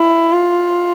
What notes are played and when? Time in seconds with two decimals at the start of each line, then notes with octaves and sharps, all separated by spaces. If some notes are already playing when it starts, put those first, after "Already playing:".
Already playing: E4
0.32 F4